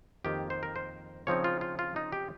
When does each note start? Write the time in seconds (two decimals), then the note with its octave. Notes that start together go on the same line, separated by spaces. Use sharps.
0.24 F2 D#3 A#3 G4
0.50 C5
0.63 A#4
0.76 C5
1.27 C#3 F3 C4 D#4 C#5
1.44 F4
1.61 F4
1.79 F4
1.96 D#4
2.12 G4